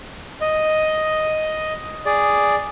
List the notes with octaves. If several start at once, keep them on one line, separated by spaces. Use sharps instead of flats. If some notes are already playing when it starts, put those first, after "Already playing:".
D#5
G#4 D5